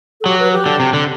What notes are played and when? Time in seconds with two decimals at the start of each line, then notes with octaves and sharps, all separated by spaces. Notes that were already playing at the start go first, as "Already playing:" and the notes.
0.21 A4
0.26 F#3 G4
0.39 B4
0.52 G4
0.66 D3
0.80 C3
0.94 D3